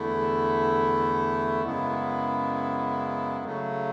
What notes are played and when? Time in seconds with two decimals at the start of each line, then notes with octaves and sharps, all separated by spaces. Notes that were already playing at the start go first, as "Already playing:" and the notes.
Already playing: E2 D3 A3 E4
1.63 F#2 C#3 G#3 B3 E4
3.45 C#3 F#3 A3